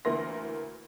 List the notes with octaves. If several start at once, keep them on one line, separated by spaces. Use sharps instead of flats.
D2 E3 A#3 C6 A#6